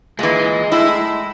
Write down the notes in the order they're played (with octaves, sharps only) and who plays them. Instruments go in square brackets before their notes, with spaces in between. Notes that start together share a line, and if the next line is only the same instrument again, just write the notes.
[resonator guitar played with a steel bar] A#2 E3 [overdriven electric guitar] G#3
[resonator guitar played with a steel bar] A2 [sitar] E4